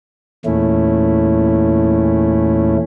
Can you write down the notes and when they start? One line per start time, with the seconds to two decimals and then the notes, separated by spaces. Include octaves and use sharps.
0.45 E2 A#2 A3 C#4 E4